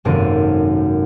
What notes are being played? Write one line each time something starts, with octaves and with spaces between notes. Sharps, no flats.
G#1 F#2 C3 A#3 A4 D#7